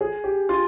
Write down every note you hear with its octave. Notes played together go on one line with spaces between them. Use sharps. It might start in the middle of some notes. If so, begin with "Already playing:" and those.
G#4
G4
F4